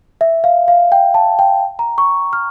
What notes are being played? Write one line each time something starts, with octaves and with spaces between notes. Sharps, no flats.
E5
F5
F5
G5
A5
G5
A#5
C#6
F6